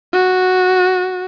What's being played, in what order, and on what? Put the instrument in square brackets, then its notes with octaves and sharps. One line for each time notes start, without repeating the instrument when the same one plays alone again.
[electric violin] F#4